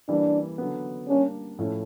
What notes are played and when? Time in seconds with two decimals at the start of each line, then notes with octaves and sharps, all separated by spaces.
0.09 E3 G3 A#3 D4
0.58 D3 F#3 B3
1.08 G3 A#3 C#4 D4 G4
1.59 A2 F3 A3 C#4 E4